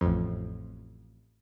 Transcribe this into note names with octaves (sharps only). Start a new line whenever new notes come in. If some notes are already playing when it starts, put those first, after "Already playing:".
A1 F2